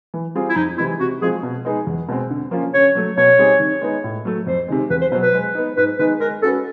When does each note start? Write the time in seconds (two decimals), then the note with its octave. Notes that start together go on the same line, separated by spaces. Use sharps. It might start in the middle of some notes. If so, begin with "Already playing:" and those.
0.14 E3
0.35 G3 C4 F4 G#4
0.49 E4
0.56 F2 D#4
0.78 C3 E3 G#3 C4 E4
1.00 C3 F#4
1.22 F3 G#3 C4 F4 G#4
1.43 B2
1.65 G#3 B3 D#4 G#4
1.87 E2
2.08 B2 G#3 C4
2.30 D3
2.51 F3 A#3 C#4 F4
2.74 C#3 C#5
2.95 F#3 A3
3.17 B2 C#5
3.39 G3 C4 D#4 G#4
3.60 D#3
3.82 G#3 B3 D#4
4.04 A2
4.25 F#3 A3
4.46 F2 C5
4.68 C3 D#3 G#3
4.90 E2 B4
5.01 C5
5.12 B2 F#3 C5
5.22 B4
5.34 G#3
5.55 B3 D#4
5.77 G#2 B4
5.99 D#3 G#3 B3 D#4 B4
6.20 G#3 A#4
6.42 C#4 F#4 A4 B4